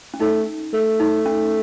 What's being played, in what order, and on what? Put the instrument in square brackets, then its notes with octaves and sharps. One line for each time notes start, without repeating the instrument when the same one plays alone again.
[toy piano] C#4
[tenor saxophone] A3 [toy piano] D#4
[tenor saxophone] A3
[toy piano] D#4
C#4